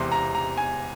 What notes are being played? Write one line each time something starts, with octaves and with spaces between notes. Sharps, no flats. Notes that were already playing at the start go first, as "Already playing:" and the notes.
Already playing: E1 E2 C3 C6
A#5
A#5
G#5